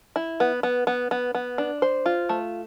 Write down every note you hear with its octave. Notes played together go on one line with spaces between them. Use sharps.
E4
B3
B3
B3
B3
B3
D4
C5
F4
A3